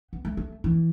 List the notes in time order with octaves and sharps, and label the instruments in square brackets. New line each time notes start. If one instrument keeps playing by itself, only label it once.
[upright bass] B3
A3
A3
E3